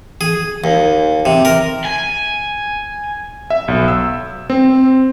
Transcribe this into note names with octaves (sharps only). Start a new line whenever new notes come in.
G#4
D#2
C3
A#4
G#5
E5
B1
E6
C4